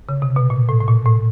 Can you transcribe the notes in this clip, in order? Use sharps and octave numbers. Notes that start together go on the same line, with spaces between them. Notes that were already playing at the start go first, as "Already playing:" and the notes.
C#3
C3
B2
A#2
A2
A2
A#2
A2